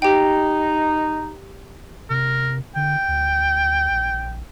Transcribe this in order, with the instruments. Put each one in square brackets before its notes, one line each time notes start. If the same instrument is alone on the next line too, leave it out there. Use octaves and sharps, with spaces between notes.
[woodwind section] D#4 [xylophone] G4 G5
[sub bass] C3 [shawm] A#4
[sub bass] D3 [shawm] G5
[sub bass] D2
A#1